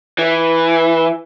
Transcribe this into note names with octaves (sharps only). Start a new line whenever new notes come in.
E3